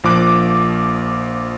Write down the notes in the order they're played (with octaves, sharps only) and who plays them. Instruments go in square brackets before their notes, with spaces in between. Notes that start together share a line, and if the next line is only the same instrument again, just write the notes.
[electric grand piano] A#1 F3 A#3 D6 F#6